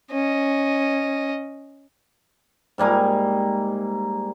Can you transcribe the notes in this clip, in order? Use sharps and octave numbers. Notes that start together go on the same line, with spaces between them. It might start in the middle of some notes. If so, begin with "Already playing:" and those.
C#4 D#5
G#2 G3 A#3 G#5